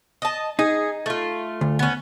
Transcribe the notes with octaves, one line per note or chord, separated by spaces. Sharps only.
D#5 A5
D#4 G#4
A3 F4
D2
B3 C#4